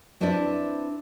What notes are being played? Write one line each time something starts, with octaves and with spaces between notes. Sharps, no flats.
C4 D4 E4 B4 C5 D5